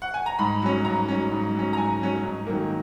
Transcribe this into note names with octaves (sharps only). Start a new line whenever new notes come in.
F#5
G#5
A#5
G#2 B5
F#3 C#4
G#2 A#5
F#3 C#4
G#2
F#3 C#4
A#5
G#2 G#5
F#3 C#4
G#2
D#3 F#3 A#3